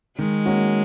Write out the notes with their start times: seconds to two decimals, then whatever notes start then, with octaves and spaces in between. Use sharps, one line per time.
0.18 D#3 G#3
0.46 A#3 C#4 F#4